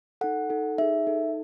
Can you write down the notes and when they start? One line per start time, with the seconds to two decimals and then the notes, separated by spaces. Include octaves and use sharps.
0.21 D#4 A4 F#5
0.50 D#4 A4
0.78 D#4 G#4 E5
1.07 D#4 A4